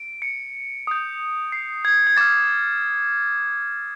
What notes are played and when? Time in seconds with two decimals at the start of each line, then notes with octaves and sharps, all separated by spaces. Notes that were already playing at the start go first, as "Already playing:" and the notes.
Already playing: D7
0.22 C#7
0.87 D#6 G6
1.52 C7
1.85 G#6
2.07 G#6
2.17 D6 F6 A6